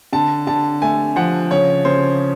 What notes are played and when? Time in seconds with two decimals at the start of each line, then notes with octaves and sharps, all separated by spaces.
0.13 D3 A5
0.47 D3 A5
0.82 A3 G#5
1.16 F3 F#5
1.51 C#3 C#5
1.85 C#3 C5